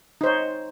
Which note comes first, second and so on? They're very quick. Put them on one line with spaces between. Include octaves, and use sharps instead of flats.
D#4 C5 C#5